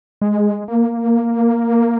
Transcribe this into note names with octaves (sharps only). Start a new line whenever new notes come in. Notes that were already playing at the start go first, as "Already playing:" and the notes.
G#3
A#3